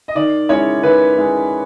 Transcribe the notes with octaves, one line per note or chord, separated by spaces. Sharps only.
D#5
D#3 D5
G#3 C#4 E4 C#5
D#3 B4
G#3 C#4 E4